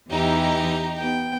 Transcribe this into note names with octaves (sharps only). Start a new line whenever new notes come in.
E2 E3 D#4 G4 A#5
B3 G5